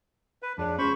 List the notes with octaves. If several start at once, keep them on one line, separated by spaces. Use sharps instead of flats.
B4
F2 D4 G#4 C#5
C#4 F4 G#4 C5 B5 C#6